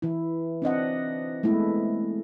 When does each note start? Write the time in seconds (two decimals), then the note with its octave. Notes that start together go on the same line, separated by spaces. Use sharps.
0.02 E3 E4
0.62 C4 D4 D#5 F#5
1.43 G#3 A3 B3 E4